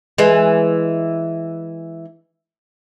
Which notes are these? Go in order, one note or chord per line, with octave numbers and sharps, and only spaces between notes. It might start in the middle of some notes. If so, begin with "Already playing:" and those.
E3 G#3